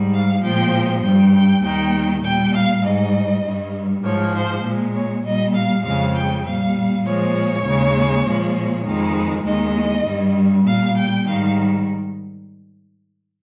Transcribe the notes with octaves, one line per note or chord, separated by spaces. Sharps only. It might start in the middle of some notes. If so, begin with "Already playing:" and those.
Already playing: G#2 G3
F5
A#2 F3 G#3 G5
G2 G3 G5
G5
D#2 D#3 G3 G5
A#2 G3 G5
F5
G#2 G3 D#5
G2 G3
G#2 F3 G#3 C#5
C5
A#2 G#3
C#5
A#2 G3 D#5
F5
F2 C#3 G#3 F5
G5
A#2 G3 F5
A#2 F3 G#3 C#5
D#2 C#3 G#3
A#2 F3 G#3
F2 D#3 G#3
D#2 D#3 G#3 D#5
G2 G3
A#2 G3 F5
G5
G#2 D#3 G3 F5